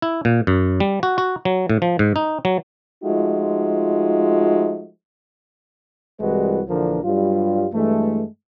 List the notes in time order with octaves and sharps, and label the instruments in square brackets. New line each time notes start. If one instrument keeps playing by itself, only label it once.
[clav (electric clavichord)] E4
A#2
F#2
G3
F#4
F#4
F#3
A2
F3
G#2
D#4
F#3
[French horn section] F3 G#3 A3 D#4 F4 F#4
[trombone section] C2 E3 G3 G#3 F#4 B4
A#1 D3 E3 F3 D4 A#4
G2 F#3 G3 F4
G2 E3 G#3 A3